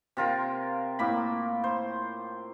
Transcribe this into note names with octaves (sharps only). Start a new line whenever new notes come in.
C3 F4 A#4
A2 A#3 B5
C5